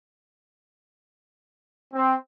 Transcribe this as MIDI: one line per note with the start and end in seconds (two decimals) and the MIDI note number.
1.93 2.14 60